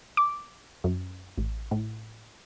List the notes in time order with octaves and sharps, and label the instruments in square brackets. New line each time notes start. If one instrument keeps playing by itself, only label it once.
[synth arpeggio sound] D6
F#2
A1
A2